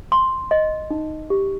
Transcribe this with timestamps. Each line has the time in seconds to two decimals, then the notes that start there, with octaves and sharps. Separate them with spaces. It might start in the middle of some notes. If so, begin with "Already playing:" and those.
0.12 C6
0.51 D#5
0.90 D#4
1.30 G4